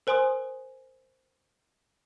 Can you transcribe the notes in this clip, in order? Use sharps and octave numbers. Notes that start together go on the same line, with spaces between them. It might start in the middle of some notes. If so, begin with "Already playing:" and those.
A#4 C5 G#5 C6 D#6